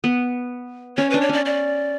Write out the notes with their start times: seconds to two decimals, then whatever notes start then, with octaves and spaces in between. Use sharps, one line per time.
0.04 B3
0.97 C#4 C#5
1.10 D4 B4
1.21 C#5
1.29 C#4 D5
1.45 D5